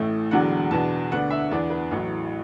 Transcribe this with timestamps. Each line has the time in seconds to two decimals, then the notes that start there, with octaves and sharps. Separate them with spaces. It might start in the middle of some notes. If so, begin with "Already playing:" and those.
Already playing: A1 A2 A3
0.31 E1 E2 D3 F#3 D4 F#5
0.71 E2 B2 B3 D4 A5
1.11 D2 D3 B3 D4 F#5
1.30 E5
1.51 E2 E3 B3 D4 D5
1.70 B4
1.91 A1 A2 F#3